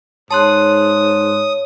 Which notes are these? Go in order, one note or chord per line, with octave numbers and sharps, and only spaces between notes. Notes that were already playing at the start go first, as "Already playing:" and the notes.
G#2 C#5 A5 C6 D#6 F#6